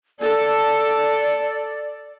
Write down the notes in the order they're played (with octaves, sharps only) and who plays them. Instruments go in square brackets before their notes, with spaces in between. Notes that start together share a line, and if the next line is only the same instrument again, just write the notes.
[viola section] A4 [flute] D5